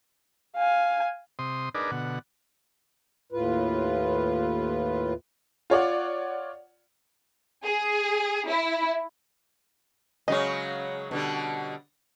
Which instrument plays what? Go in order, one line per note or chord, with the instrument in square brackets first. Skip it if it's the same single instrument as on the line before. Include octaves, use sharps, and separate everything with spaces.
[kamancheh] F5 G#5
[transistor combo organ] C3 C6 D#6
D4 D#4 G#4 A#4 B4 D5
B2 D3 F#5
[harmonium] D#2 A2 F4 B4
[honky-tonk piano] F4 C#5 D5 F#5
[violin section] G#4
E4
[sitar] C#3 F#3 G#3 [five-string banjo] C#4 D#5
[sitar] B2 D3 G3